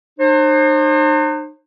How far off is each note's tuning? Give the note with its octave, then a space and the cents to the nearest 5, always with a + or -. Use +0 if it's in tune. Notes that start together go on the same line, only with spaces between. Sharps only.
D#4 -45 C5 +35